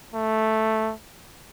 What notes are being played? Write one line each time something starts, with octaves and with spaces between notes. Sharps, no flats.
A3